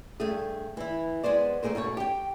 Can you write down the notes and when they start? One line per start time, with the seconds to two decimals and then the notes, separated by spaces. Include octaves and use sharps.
0.20 G2 A3 G#4
0.77 E3 E4
1.23 G#3 B3 C5 D5
1.63 A3 D4 G#4 A#4 C5
1.75 G#2 B2 A3 C#5
1.97 G4 G5